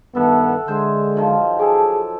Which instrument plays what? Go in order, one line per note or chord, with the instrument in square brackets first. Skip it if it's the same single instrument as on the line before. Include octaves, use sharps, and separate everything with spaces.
[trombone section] G2 D#3 B3 [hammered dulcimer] A4 E5 F#5
[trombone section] D3 G#3 [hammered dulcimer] G#4 C5 E5
[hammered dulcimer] D#3 F3 F#3
[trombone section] G#4 [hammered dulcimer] A4 G#5 D6